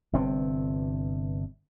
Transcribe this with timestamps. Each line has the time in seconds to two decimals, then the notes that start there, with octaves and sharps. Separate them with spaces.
0.13 G1 G2 C3 C4